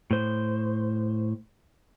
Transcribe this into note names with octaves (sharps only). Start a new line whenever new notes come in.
A2 C5